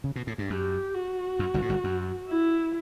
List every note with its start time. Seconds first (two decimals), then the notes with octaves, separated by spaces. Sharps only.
0.04 C#3
0.16 B2
0.27 A2
0.38 G2
0.50 F#2 G4
0.94 F#4
1.39 F#2
1.54 G1 G2
1.62 A2
1.69 G1 G2
1.84 F#2
2.29 E4